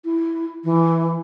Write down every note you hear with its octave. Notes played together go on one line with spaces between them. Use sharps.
E4
E3